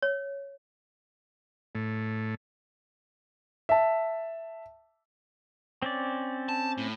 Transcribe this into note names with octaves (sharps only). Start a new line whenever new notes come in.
C#5
A2
E5 A5
C4 C#4 D5
A5
A2